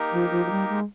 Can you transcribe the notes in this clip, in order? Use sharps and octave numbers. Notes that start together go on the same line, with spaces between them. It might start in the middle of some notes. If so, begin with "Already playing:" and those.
Already playing: A#3 D#4 G4 A#4
F3
F3
F3
G3
G#3